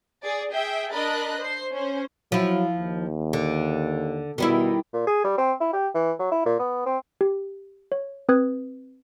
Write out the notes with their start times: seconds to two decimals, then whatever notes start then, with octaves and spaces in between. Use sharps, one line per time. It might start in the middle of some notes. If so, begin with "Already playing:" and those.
0.22 G#4 D5
0.52 G#4 E5 G5 B6
0.92 D4 A#4 D#5 B5 F#6 A6
1.40 C5 C7
1.72 C#4 C5
2.32 F3 F#3 E4
2.74 D#2
3.33 D3
4.38 B2 D#3 G3 E4
4.94 A#2
5.07 G#4
5.25 G3
5.38 C4
5.60 E4
5.73 G4
5.95 E3
6.19 F#3
6.32 E4
6.45 A#2
6.59 B3
6.86 C4
7.21 G4
7.92 C#5
8.29 C4 B4 D#6 F#6 G#6